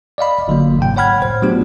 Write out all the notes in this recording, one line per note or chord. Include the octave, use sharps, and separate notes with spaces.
D5 D#5 F5 B5
G1 D3 F#3 A#3
G#2 C3 G5
C#5 F#5 B5 F6 G#6
A2 C5
F#3 A3 B3 D4 F4 G4